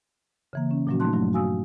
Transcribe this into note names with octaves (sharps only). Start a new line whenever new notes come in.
C#3 E3 A#3
C#4
A#2 F3 F#3 A#3 C#4 F#4
A3 D#4 A5 C6 F#6
G2 F#3 A3 D4
F#4 F5 G#5 D#6 E6